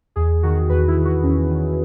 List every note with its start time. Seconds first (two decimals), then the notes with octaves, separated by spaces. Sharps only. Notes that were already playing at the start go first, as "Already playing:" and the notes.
0.16 E2 G#4
0.43 D#3 F#4
0.69 E2 B4
0.88 E4
0.96 D#3
1.05 F#4
1.23 E2 C#4
1.50 D#3